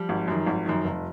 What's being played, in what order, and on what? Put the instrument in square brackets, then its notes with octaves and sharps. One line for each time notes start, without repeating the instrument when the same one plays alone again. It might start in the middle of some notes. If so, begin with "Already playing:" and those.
Already playing: [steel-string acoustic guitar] F3 G3
[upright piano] G#1
F#2 D#3
G#1
F#2 D#3
F1